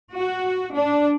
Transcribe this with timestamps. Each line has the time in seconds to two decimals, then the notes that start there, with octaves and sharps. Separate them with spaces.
0.14 F#4
0.73 D4